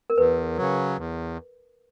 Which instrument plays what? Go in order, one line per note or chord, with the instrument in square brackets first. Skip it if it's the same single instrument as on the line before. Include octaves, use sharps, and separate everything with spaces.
[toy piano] A#4
[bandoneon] E2 [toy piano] B4
[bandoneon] C#3 F#3
E2